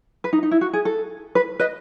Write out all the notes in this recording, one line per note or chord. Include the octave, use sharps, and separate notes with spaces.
B4
D#4
D#4
E4
F#4
G#4
A4
B4
B4 D#5